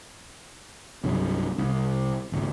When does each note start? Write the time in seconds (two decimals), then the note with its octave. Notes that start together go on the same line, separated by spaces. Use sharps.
1.04 C2 G2 F#3
1.58 C2
2.32 G#1 C#2